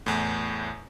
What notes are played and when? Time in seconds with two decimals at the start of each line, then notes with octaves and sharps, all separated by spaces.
0.06 E2 A2